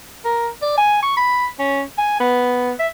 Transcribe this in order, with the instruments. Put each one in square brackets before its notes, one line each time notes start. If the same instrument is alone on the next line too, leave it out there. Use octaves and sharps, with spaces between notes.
[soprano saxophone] A#4
D5
G#5
C#6
B5
C#4
G#5
B3
E5